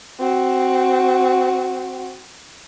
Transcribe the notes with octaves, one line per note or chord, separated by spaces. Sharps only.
C4 F#4